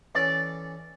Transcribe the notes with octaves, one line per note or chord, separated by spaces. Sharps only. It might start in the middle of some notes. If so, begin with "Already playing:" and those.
E3 C#4 A4 D5